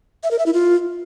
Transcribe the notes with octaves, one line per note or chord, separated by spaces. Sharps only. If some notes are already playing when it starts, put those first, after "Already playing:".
E5
A#4
E5
E4
F4